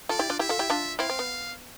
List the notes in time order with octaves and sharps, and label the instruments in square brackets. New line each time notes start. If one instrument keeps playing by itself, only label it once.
[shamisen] F4 A4 [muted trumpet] D5
[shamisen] E4 G4
D4 F4
[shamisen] E4 G4 [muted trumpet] E5
[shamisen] F4 A4
E4 G4
D4 F4
[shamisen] C4 E4 [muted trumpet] F5
[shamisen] C4
B3